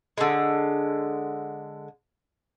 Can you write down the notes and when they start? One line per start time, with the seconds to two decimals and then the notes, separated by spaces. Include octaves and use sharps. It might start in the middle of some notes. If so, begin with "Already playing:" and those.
0.18 D3 G#3